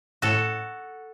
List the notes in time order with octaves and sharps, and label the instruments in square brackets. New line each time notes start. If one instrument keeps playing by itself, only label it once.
[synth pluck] A2 [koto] F#4 A4